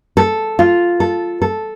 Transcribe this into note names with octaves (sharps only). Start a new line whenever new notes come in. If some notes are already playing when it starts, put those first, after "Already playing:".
A4
F4
A4
A4